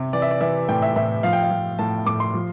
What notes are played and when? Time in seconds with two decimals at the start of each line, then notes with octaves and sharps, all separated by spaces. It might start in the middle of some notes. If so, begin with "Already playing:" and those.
Already playing: C3
0.13 E3 D5
0.22 E5
0.31 D5
0.41 E3 E5
0.69 A2 G5
0.82 E5
0.96 A2 E5
1.23 F3 F5
1.33 G5
1.43 F5
1.51 F3
1.79 A2 A5
2.06 A2 D6
2.20 C6
2.34 F3